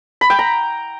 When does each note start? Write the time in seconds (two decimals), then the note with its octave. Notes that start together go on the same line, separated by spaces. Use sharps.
0.21 B5
0.30 G5
0.39 A#5